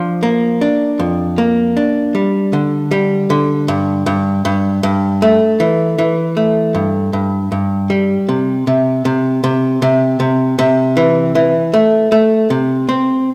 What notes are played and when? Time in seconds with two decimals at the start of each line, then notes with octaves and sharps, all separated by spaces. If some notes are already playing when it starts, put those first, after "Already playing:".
Already playing: F3 D4
0.23 A#3
0.61 D4
0.99 F2
1.38 A#3
1.77 D4
2.15 G3
2.53 D3
2.91 G3
3.30 D3
3.68 G2
4.06 G2
4.45 G2
4.83 G2
5.22 A3
5.60 E3
5.98 E3
6.37 A3
6.75 G2
7.13 G2
7.52 G2
7.90 G3
8.29 C3
8.67 C3
9.05 C3
9.44 C3
9.82 C3
10.20 C3
10.59 C3
10.97 E3
11.35 E3
11.74 A3
12.12 A3
12.50 C3
12.89 C4